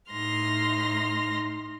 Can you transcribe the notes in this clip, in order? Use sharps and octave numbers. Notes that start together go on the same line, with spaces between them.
A2 D#4 C6 F6 A#6